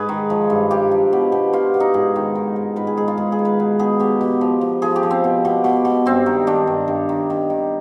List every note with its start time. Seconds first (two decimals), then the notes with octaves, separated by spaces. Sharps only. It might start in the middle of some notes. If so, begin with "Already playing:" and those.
Already playing: G#2 G#4 B4
0.09 D#3
0.30 F3
0.50 G2
0.71 G2 G4
0.91 F3
1.13 B2
1.32 B2
1.53 B2 F4
1.74 B2
1.80 D#4
1.94 G#2 G#4
2.16 D#3
2.35 D#3
2.56 G#2
2.76 G#2 B4
2.87 G#4
2.97 G#2 G#4
3.08 F4
3.18 G#2 G#4
3.32 G#4
3.39 D#3
3.45 B4
3.59 B2 B4
3.79 B2 G#4
4.00 B2 G4
4.21 B2
4.41 F3
4.61 F3
4.82 F3 G#4
4.96 G4
5.03 F3
5.10 C4
5.24 B2
5.45 B2
5.64 B2
5.85 B2
6.06 G2 C4
6.26 D#3
6.47 D#3 D4
6.67 G2
6.88 G2
7.09 D#3
7.30 D#3
7.50 D#3